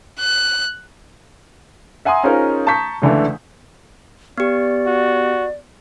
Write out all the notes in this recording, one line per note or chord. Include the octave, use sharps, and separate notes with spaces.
F#6
E5 F#5 G#5 A#5 C6 D#6
C#4 D#4 F4 G#4 A#4 C5
A5 A#5 C#6 G6 B6
C#2 D3 E3 A3
B3 G4 D5
F#4